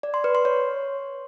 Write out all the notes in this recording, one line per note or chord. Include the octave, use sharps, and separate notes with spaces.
D5
C6
B4
C6
C#5